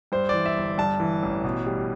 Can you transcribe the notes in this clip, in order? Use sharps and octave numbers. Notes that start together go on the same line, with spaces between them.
G2 C5
E3 D5
E5
G1
G2 A5
E3
A1
B2
G3